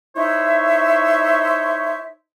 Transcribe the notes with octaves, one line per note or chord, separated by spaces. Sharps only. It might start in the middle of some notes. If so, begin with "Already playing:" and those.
D#4 E4 C5 C#5 E5